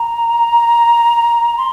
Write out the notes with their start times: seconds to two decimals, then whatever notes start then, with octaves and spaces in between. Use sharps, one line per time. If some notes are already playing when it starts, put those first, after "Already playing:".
Already playing: A#5
1.58 C6